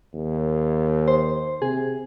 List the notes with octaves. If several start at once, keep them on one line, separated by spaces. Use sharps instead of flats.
D#2
C5
C3 G#4